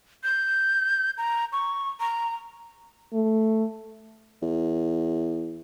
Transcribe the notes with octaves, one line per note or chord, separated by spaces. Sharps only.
G6
A#5
C#6
A#5
A3
E2